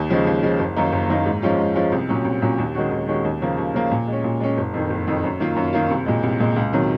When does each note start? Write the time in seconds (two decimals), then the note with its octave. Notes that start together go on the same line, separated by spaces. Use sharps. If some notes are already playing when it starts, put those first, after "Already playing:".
Already playing: D#2
0.10 C#3 F3 G#3
0.27 D#2
0.43 C#3 F3 G#3
0.59 F#1
0.76 F#2 D#3 A#3 D#4
0.92 F#1
1.09 F#2 D#3 A#3 D#4
1.26 G#2
1.42 F3 G#3 C#4 F4
1.58 G#2
1.75 F3 G#3 C#4 F4
1.92 C2
2.09 A#2 F#3 C#4
2.24 C2
2.42 A#2 F#3 C#4
2.58 D#2
2.75 D#3 G#3 C#4 F#4
2.91 D#2
3.07 D#3 G#3 C#4 F#4
3.24 D#2
3.42 C#3 F3 A#3
3.58 D#2
3.74 C#3 F3 A#3
3.91 A#2
4.07 G#3 C#4
4.24 A#2
4.40 G#3 C#4
4.58 F#1
4.74 F2 D#3
4.90 F#1
5.07 F2 D#3
5.24 F#2
5.40 D#3 A#3 F4
5.56 F#2
5.73 D#3 A#3 F4
5.90 C2
6.06 A#2 G#3
6.23 C2
6.40 A#2 G#3
6.56 C#2
6.72 C3 D#3 F#3